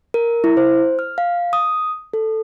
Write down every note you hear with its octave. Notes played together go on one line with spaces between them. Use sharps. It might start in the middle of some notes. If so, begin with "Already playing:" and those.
A#4
E4
C5
F6
F5
D#6
A4